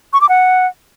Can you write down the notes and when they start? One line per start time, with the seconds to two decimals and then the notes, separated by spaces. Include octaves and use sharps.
0.13 C#6
0.21 D6
0.29 F#5